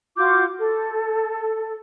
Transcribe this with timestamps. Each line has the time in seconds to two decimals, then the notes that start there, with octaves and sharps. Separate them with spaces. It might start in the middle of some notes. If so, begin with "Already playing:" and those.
0.17 F4 F#4 D6 G6
0.60 A4